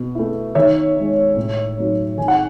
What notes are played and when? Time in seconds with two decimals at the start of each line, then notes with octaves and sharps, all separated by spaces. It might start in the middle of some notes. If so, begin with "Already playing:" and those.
Already playing: B2
0.15 A3 E4
0.55 D#3 C#5 E5
0.95 G#3 D#4
1.37 A2
1.77 F#3 A3 D#4
2.18 D#3 G#5
2.28 F#5